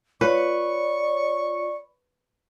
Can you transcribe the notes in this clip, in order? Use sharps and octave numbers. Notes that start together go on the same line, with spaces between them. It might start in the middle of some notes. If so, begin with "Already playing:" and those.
F4 B4 C#5 D5 C#6